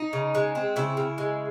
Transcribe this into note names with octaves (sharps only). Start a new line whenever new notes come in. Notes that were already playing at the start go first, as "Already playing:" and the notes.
Already playing: D#4
C#3
G#3
C4
C#3 E4
C#3
G#3